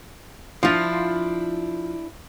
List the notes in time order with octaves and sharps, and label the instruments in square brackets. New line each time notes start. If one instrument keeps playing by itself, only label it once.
[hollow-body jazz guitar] F3 F4 [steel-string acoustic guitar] D4 E4